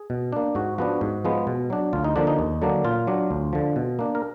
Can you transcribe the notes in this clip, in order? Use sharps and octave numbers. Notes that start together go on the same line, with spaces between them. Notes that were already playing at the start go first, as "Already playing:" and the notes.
Already playing: G#4
B2
A#3 D4
G#2 F#4
F3 B3 D4 F#4
G#2
F3 G#3 B3
B2
F#3 D4
D2 F4
D#4
D3 F3 A#3 D4
D#4
D#2
D3 F#3 A#3 D4
A#2 F4
F#3 D4
D2
D3 F3
B2
A#3 D4
A#4